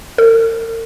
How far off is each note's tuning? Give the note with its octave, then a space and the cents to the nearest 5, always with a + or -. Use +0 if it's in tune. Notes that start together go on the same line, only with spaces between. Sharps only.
A#4 -45